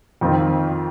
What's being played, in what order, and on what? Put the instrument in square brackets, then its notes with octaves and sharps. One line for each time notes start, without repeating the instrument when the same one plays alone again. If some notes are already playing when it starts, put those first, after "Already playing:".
[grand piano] F2 D#3 C4 F4